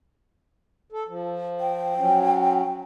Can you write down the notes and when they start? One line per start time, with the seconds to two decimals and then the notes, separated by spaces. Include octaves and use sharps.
0.92 A4
1.09 F3
1.60 G5
1.99 F#3 C#4